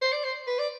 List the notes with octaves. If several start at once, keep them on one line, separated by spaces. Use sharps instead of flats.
C5
D5
C5
B4
D5